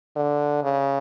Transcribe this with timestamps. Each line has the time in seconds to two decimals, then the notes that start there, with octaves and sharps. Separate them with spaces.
0.16 D3
0.63 C#3